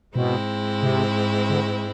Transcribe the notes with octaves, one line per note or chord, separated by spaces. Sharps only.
G#2 B2 G#3 C4 E4
C3
D3